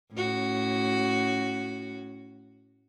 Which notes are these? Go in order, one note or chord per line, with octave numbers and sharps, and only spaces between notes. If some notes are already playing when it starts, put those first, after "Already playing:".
A2 C#4 F#4